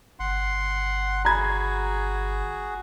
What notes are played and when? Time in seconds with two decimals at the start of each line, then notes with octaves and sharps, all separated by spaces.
0.20 G1 F#5 C6
1.25 F#4 G#4 A#5 B5 G#6